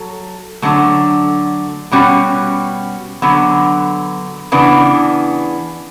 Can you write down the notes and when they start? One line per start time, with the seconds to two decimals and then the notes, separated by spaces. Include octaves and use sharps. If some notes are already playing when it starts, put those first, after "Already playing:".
Already playing: F#3 A4
0.62 D3 F#3 A3
1.91 B2 G3 C#4 F#4
3.22 D3 F#3 B3
4.52 C#3 E3 B3 D4